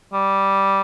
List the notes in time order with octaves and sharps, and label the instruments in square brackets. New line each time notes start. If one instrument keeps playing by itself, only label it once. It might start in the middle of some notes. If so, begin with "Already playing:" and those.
[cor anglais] G3